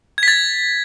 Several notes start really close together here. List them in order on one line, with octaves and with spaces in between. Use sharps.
G#6 B6 A6